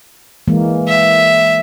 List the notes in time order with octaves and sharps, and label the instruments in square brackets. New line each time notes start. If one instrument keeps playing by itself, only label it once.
[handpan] E3 G#3 A#3
[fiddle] E5